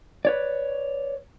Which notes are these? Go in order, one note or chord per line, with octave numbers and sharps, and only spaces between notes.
B4 C#5 D5